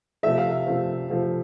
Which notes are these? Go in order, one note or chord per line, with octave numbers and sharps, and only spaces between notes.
C3 F3 A3 E5
F5
C3 F3 A3
C3 F3 A3